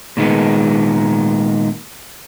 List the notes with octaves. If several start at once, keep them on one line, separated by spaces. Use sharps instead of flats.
A#2 D#3 G#3 B3